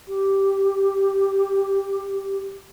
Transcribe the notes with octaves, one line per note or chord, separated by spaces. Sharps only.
G4